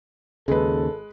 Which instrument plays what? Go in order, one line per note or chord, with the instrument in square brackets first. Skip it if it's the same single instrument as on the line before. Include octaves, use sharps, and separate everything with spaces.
[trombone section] G#1 A4 [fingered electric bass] D#2 C#3 [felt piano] G#3 B4